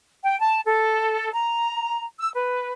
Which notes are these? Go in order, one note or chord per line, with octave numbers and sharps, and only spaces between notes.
G5
A5
A4
A#5
E6
B4